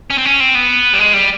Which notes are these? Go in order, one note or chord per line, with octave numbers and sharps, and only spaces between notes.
C#4
C4
C#4
C4
B3
G3
G#3
G3